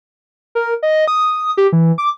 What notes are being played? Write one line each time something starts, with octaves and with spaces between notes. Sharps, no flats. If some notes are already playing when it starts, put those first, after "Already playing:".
A#4
D#5
D#6
G4
E3
D6